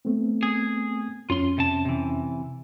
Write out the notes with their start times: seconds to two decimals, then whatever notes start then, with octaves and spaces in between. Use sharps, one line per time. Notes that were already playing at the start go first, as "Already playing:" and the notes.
0.05 A3 B3 C4
0.43 G#4
1.30 F2 C#4 F4 C6
1.58 C3 A5
1.85 C3 E3